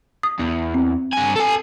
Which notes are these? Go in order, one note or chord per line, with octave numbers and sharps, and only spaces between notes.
D#6
E2
C4
G2 G#5
A4 G#5